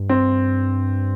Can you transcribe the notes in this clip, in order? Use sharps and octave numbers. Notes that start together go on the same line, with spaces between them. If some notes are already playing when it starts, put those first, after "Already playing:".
Already playing: G2
C4